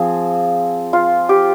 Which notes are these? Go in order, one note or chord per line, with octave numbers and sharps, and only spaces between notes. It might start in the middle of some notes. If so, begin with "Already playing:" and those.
Already playing: F3 C4 G#4
F4
G4